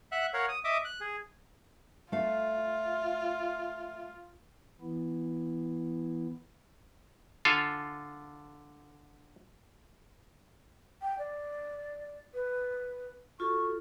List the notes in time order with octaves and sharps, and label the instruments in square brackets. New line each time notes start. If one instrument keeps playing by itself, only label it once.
[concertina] E5 F#5 F#6
A#4 C#5 F5 F#5
D#6
D#5 E5 D6 D#6
F#6
G#4
[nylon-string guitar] A3 F5 [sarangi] F4
[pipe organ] E3 B3 E4
[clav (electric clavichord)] D3 F4 A4 F5 G#5
[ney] G5
D5
B4
[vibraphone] F4 F#4 A4 [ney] C#6